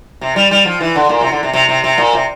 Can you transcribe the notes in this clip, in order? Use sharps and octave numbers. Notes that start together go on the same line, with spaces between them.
C3
G3
G3
F3
E3
D3
A#2
C3
D3
C3
C3
C3
C3
A#2
C3